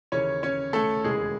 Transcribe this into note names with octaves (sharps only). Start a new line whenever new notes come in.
D#2 C#3 E3 C#4 C#5
C#4 C#5
A3 A4
E1 D#2 C#3 E3 G#3 G#4